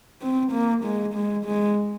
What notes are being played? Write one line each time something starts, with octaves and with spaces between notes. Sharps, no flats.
C4
A#3
G#3
G#3
G#3